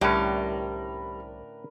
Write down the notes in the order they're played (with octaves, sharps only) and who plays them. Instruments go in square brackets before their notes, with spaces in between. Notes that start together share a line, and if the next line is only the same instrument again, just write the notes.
[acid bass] C2 [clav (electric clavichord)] A2 D3 C#4 [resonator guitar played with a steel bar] G3 [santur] A#4 B4 A#5